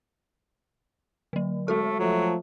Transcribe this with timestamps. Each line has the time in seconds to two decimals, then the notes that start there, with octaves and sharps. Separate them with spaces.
1.33 D3 F#3
1.68 G#3 A3 F#4 A4
1.99 F3 F#3 A3